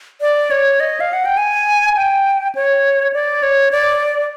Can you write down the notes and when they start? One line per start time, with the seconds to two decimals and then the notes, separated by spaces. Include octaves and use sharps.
0.21 D5
0.51 C#5
0.80 D#5
1.00 F5
1.13 F#5
1.25 G5
1.37 G#5
1.96 G5
2.55 C#5
3.13 D5
3.43 C#5
3.71 D5